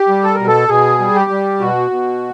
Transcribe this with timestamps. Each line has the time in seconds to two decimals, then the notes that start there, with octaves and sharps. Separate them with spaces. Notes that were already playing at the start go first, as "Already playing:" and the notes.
Already playing: G4
0.08 G3
0.24 A4
0.35 B2 A#4
0.47 A4
0.68 B2 G#4
0.99 G3
1.15 G4
1.30 G3
1.60 B2 F#4
1.91 B2